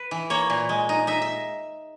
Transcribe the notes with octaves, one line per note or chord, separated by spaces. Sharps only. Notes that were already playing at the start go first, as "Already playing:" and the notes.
Already playing: B4
E3
A#3 C#5
A#2
G#3
D#4
D#4 E5
E5